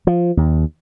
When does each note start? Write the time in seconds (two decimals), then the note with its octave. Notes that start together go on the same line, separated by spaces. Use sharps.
0.07 F3
0.37 D#2